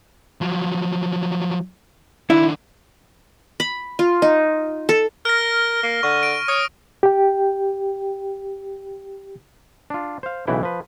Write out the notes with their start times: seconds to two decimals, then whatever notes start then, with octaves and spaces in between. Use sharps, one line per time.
0.41 F3 F#3
2.30 D#3 D4 E4
3.60 B5
3.99 F4
4.22 D#4
4.89 A4
5.25 A#4 F6 A#6
5.83 A#3
6.03 D3 C#6
6.23 D7
6.48 C#5 D#6
7.03 G4 G5
9.90 D4 F4
10.23 C5 F5
10.47 B1 C#3 E3 E4 F#5 G5
10.63 F3 B4